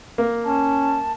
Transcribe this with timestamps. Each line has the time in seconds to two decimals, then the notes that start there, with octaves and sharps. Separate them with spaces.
0.18 A#3
0.45 C#4 A5